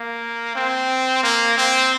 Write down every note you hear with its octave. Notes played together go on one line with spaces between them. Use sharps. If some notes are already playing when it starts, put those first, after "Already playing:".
Already playing: A#3
C4
A#3
C4